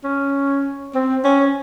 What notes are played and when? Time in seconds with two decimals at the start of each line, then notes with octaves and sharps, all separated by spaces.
0.04 C#4
0.95 C4
1.24 C#4